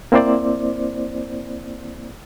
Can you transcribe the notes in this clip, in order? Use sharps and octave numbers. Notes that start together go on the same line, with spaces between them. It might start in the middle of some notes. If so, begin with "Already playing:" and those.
A#3 C4 E4 C5 D5